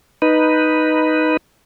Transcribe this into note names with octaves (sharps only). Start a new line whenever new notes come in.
D#4 B4